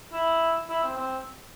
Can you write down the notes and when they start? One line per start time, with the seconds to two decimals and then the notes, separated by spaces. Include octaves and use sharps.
0.13 E4
0.70 E4
0.83 C4
0.97 C4